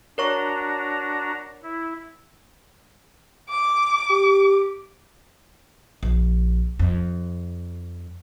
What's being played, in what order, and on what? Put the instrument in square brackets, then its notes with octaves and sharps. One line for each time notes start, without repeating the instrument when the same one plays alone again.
[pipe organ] D4 F#4 A#5 [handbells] A#4 C#5 C#6
[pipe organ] E4
[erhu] D6
[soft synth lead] G4
[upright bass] A#1
F2